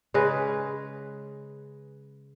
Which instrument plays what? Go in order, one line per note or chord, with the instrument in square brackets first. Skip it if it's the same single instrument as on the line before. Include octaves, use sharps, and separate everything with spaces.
[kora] C#3 G#3 B4